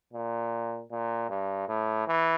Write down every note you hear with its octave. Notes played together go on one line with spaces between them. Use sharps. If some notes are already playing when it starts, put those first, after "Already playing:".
A#2
A#2
G2
A2
E3